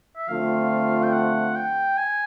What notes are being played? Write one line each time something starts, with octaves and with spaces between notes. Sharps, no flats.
E5
D3 F3 A3 C4 F4 F5
G5
F#5
G5
G#5